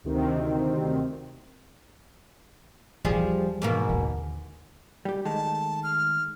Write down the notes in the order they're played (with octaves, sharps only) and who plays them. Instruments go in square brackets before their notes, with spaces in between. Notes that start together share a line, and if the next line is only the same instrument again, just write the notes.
[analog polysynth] D2 C3 D#3 C4
[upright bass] E2 E3 [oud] F3 G3 G#4
[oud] G#2 B2 A#3
[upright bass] D#2 D3
[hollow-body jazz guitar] G3 G4
[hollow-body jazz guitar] D#3 G#3 A3 [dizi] A5
[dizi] F6